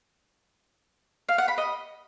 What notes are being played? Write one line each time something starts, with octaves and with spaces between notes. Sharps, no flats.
F5
F#5
B5
D#5